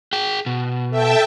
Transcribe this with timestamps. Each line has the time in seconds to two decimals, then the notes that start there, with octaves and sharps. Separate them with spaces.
0.13 G#4 G5
0.46 B2
0.91 A4 E5 G5 A5